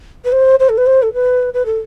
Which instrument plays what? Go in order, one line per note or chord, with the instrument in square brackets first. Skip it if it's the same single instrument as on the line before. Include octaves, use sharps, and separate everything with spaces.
[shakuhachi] B4
C5
C5
A4
B4
C5
A4
B4
B4
A4